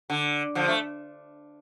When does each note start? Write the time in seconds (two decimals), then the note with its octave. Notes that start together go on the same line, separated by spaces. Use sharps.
0.10 D3
0.55 D3 F3
0.68 A3